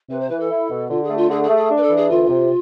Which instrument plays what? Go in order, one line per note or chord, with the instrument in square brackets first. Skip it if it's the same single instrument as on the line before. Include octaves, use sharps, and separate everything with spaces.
[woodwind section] C3 [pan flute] B4
[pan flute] C5
[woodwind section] E3 [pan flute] B4
[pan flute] A4
[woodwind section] E4
B2
[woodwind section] D3 [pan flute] F4
[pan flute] G#4
[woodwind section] A3
[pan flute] F4
[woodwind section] D3 [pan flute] G#4
[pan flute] G#4
[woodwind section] A3
[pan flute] G#4
[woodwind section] D4
[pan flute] B4
A4
[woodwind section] E3
[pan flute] G#4
[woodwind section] D2 [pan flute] F4
[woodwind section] C3